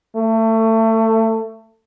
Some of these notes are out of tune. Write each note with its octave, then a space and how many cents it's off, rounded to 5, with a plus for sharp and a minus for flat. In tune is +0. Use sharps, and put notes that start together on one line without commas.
A3 +25